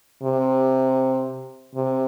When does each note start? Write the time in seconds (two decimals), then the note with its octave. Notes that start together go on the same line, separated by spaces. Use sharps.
0.23 C3
1.75 C3